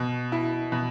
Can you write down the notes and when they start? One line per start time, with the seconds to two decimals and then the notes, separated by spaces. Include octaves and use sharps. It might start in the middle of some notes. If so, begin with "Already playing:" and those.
Already playing: B2
0.32 E4
0.72 B2